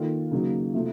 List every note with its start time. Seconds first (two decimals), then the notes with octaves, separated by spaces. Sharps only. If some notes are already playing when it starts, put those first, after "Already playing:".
Already playing: D#3 A#3 F4 A4
0.31 C#3 F#3 A#3 D#4
0.73 C3 F3 A3